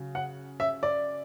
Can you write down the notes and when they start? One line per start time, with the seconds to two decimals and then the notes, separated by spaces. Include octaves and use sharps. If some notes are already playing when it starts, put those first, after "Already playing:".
Already playing: C#3 F#3
0.15 F#5
0.60 E5
0.83 D5